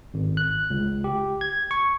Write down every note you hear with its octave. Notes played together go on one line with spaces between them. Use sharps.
G#1
F#6
C#2
G4
G#6
C#6